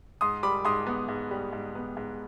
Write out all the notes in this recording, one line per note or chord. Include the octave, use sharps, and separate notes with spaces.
G#2 C6 D#6
G3 B5 D6
G#2 C6 D#6
B3
G#2
G3
G#2
B3
G#2